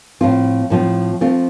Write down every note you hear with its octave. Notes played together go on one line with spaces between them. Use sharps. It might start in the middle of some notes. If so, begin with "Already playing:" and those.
A2 F3 C4 F4
A2 F3 C4 F4
F3 A3 C4 F4